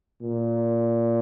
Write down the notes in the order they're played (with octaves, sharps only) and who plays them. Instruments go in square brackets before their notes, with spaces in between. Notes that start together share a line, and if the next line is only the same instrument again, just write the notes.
[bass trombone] A#2